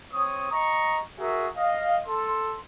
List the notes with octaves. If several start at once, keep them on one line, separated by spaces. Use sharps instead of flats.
C4 C#5 D#6
D#5 A#5 C#6
F#4 G#4 A#4 E5
D#5 F5
A4 C6